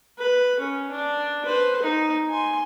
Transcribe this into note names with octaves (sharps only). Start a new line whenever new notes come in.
B4
C#4
D4
B4 C5
D#4
G#5 C6